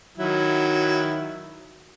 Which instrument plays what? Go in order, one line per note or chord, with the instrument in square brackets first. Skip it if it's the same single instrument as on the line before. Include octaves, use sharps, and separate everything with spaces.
[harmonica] D#3 F#3 E4